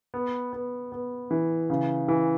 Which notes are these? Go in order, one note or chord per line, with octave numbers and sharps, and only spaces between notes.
B3
B3
B3
E3
C#3
E3